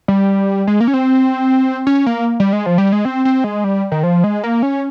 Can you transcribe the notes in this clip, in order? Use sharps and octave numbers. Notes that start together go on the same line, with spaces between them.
G3
G#3
A#3
C#4
C4
C#4
A#3
G3
G#3
F3
G3
G#3
C4
C4
G#3
G3
D#3
F3
G#3
A#3
C#4